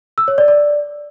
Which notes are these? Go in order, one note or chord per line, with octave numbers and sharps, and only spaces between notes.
E6
C#5
D5
D5